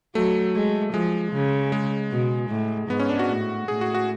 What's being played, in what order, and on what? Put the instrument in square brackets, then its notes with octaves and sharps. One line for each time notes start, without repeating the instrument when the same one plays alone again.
[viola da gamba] F#3 [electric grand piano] A3
[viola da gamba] G#3
[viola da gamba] F3 [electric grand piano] G#3
[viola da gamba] C#3
[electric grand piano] G#3
[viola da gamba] B2
A2
[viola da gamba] G#2 [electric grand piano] B3
[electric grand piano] C#4
D4
F#4
[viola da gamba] A2
[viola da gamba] A2 [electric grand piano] G#4
[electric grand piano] F#4
F#4